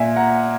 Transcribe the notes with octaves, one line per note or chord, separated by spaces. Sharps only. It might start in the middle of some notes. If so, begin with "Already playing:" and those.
Already playing: A#2 E5 G#5
F#5 A#5